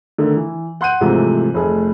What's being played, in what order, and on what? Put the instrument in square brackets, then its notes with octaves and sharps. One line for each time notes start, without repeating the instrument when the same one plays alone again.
[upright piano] D3 D#3 A3
E3
F#5 C6 F#6 G6 D#7
G#2 C3 E3 F3 A3
F1 A3 G#4